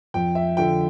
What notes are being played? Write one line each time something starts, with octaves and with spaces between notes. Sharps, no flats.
F2 G5
E5
D3 F3 G5